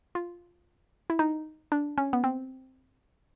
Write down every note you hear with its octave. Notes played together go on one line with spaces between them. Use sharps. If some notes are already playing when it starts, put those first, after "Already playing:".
F4
E4
D#4
D4
C#4
B3
C4